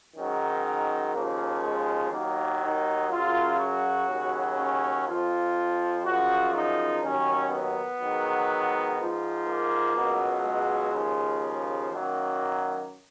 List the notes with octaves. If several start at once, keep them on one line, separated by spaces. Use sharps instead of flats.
G#2 D#3 F#3 C#4
D#2 C#3 F3 A#3
G#3
D#2 D#3 F#3 A#3
D#4
F#2 C#3 F#3 F4
F#4
D#2 C#3 F#3
C#4
F2 F3 F4
F#2 C#3 F3 F#4
D#4
D#2 D#3 F#3 C#4
B3
G#2 D#3 F#3
G#2 F3
A#3
C#2 B2 F#3
G#3
D#2 C#3 F3
F#2 D#3 F#3 A#3